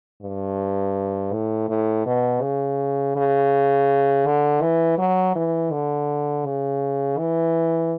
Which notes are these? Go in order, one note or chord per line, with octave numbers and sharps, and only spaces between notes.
G2
A2
A2
B2
C#3
C#3
D3
E3
F#3
E3
D3
C#3
E3